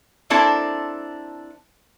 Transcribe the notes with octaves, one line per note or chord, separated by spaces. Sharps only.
A#3 C4 D4 E4 A4 C5